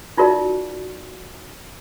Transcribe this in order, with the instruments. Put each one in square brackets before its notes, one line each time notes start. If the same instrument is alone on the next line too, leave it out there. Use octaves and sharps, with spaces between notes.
[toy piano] D#4 F4 F#4 A#4 D5 E5